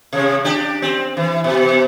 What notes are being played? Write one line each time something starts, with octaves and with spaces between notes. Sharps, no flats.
C3
D4 G4
C4
E3
B2